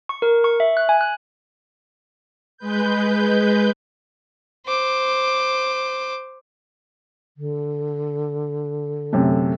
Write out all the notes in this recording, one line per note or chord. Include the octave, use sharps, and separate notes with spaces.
C#6
A#4
C#6
E5
F#6
G#5
F#6
G#3 B4 G6
C5 D6
D3
F#2 C3 A3